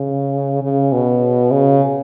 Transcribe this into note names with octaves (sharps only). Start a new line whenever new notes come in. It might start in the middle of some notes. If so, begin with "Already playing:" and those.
Already playing: C#3
C#3
B2
C#3